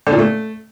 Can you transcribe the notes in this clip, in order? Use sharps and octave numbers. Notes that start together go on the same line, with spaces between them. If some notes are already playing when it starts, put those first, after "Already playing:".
D3
A#2
A3